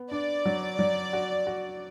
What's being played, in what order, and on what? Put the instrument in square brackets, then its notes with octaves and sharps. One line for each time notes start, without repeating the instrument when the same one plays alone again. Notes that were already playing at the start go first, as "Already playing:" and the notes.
Already playing: [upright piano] B3
[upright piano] D4 [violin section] D5
[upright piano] F#3
F#3
F#4
F#4